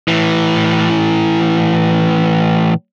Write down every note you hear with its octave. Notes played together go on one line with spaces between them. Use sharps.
A2 E3